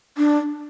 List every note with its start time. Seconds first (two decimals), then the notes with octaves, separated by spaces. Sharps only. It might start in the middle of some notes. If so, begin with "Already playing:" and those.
0.17 D4